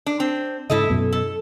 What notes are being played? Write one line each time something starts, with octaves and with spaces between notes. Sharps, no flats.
D4
C4
G#2 C#3 E4 A4 D#5
F#2 B2
A4